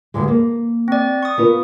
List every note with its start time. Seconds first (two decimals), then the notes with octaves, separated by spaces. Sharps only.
0.14 D2 G2 G#3
0.28 A#3
0.88 C4 D5
1.23 C#6 D#6
1.38 B3 F4 A#4